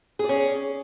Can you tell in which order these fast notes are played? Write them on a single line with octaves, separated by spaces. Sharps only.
G#4 D5 C#4